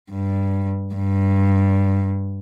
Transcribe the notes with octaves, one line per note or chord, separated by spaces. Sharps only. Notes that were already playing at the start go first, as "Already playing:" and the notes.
G2
G2